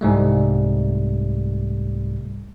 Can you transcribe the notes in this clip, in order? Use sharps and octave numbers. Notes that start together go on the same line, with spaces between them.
C2 G#2 G3 A3